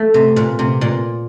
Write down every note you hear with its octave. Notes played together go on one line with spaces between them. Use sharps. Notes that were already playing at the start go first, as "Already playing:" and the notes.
Already playing: A3
C3
A#2
C3
A#2